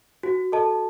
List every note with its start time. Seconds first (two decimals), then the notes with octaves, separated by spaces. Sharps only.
0.23 F#4
0.52 A4 D#5 A5